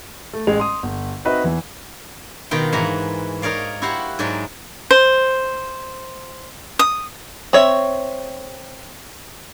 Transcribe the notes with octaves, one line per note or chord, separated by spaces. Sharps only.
A3
A1 G#3 F7
C6 D#6
G1
C4 D#4 F#4 B4 D#5 E5
E2 E3
B2 D#3 F4 G5
G#2 E3 F#5 A#5
D#4 A#4 C#5 D5 F5
E4 F#4 G4 C5 F5 F#5
G#2 F#3 G#3 D5 G5
C5
D#6
C4 C#5 E5